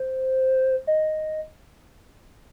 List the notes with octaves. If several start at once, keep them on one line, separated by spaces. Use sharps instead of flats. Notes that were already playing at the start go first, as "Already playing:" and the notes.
Already playing: C5
D#5